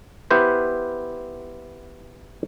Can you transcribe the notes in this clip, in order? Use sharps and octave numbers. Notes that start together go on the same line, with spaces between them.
B3 E4 G4 B4 C5